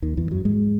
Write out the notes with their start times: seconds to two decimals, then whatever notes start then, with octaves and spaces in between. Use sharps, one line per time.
0.02 D#2 D#3
0.17 E2 E3
0.31 F#2 F#3
0.45 G#2 G#3